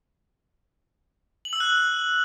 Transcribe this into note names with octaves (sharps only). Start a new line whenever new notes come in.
F#7
E6
F#6